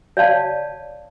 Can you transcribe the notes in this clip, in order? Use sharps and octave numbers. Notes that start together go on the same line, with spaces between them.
C#5 D5 F5 A5